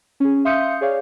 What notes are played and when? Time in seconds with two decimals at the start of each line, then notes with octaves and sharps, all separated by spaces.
0.20 C#4 G#4
0.45 E5 F5 C6 D#6 G6 C#7
0.81 G#4 C#5 D5 F5